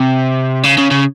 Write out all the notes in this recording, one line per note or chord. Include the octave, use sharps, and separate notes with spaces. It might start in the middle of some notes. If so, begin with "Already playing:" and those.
Already playing: C3
C#3
C#3
C#3